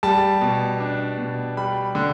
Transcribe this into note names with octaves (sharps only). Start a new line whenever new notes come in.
G3 A5
B2
D4
B2
G3 B5
D3